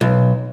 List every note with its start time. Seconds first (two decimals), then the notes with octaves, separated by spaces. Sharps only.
0.01 B1